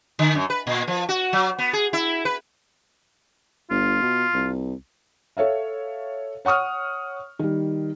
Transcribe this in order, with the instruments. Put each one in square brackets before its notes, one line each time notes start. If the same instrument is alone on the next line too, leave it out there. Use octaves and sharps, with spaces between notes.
[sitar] D3
F#2
B4
A#2
F3
F#4
F#3
B3
G#4
E4
B4
[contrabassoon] G1 [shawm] F4
[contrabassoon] B2
C2
[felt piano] A4 C#5 E5 F5
C#5 F#5 C#6 D#6 F6
D#3 G3